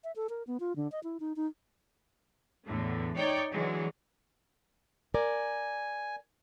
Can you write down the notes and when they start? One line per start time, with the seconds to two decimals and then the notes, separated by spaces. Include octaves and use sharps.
0.04 E5
0.16 A4
0.29 A#4
0.47 B3
0.60 F4
0.76 D3
0.92 D#5
1.04 E4
1.20 D#4
1.36 D#4
2.65 E2 A2 D3
3.16 D#4 C#5 D5 G5
3.51 D3 E3 F#3 G#3
5.14 A#4 D5 G#5